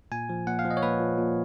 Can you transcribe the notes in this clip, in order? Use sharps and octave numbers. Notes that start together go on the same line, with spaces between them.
A#2 G#5
F3
A#2 F#5
F5
F3
D#5
C#5
A#2 B4
F3
A#2